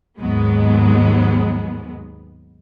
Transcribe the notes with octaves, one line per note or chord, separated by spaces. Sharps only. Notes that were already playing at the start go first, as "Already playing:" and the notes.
D#2 G#2 F#3 G#3 B3